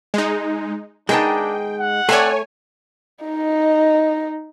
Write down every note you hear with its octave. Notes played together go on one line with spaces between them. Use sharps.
G#3 D#4
D#3 G#3 B3 D4 D#4 G5 A5
F#5
A3 C4 A4 C#5 D5 G#5
D#4 D#5